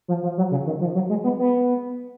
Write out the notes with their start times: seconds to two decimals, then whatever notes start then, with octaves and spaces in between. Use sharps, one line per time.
0.08 F3
0.23 F3
0.37 F#3
0.51 C#3
0.66 D#3
0.81 F3
0.95 F#3
1.09 G#3
1.24 B3
1.39 B3